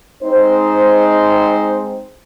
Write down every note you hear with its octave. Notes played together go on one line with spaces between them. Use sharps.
G#3 C4 D#4 C5